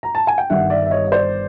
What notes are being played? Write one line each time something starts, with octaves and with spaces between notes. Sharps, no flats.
A#5
A5
G#5
G5
G1 G2 D#3 E5 F#5
D5 E5
E5
C#5 D#5
D#5
C5 D5